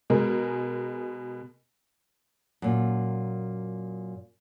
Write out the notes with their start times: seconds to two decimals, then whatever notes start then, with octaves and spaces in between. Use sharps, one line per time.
0.10 B2 G#3 A#4
2.62 F#2 A#2